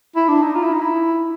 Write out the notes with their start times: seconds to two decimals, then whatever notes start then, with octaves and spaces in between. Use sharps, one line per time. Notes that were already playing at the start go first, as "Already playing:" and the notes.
0.16 E4
0.28 D4
0.42 D#4
0.56 F4
0.64 E4
0.73 D#4
0.82 E4